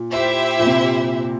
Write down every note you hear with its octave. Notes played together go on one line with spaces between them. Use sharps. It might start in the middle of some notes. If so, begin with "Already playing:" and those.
Already playing: A#2
E4 G4 C5 E5
A#2
C3